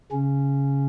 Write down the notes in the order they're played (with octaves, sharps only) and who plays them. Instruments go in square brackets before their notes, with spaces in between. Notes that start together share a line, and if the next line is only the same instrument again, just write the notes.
[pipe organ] C#3 C#4